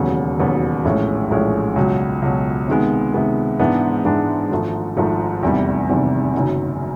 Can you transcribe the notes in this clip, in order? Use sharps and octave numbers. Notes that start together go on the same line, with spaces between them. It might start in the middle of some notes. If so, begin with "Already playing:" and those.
Already playing: E1 D#2 C#3 F#3 B3
E1 D#2 C#3 F#3 B3
A#1 A2 E3 G#3 C#4
A#1 A2 E3 G#3 C#4
C#2 B2 F#3
C#2 B2 F#3
C3 D#3 G#3 B3
C3 D#3 G#3 B3
G#2 E3 G#3 B3 D4
G#2 E3 G#3 B3 D4
G#1 G#2 F3 A3
G#1 G#2 F3 A3
F1 E2 C3 D#3 G3
F1 E2 C3 D#3 G3
F#1 F#2 D#3